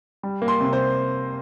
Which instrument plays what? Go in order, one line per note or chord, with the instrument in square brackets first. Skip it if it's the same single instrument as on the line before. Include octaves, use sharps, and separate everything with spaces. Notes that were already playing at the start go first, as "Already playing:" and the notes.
[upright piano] G3
A#3
C6
C3
C5